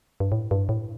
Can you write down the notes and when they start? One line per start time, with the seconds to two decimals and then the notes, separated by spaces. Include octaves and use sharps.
0.20 G2
0.32 A2
0.51 G2
0.69 A2